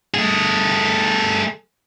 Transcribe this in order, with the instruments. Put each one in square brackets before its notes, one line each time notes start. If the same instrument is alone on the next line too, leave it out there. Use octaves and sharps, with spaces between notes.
[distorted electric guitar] A3 G#4